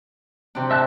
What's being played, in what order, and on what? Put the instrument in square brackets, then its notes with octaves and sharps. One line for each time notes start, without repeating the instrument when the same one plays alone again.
[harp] C3 D4
[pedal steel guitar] E5 A5 F#6